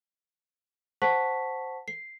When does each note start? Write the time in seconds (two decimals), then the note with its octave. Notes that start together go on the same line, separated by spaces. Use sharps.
1.02 C5 F#5 A5 C#6 B6
1.88 C7